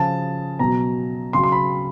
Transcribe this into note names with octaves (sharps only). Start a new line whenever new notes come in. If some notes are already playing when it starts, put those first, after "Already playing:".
Already playing: C#3 F3 A5
B2 F#3 A#5
C#3 F#3 C6
C6
B5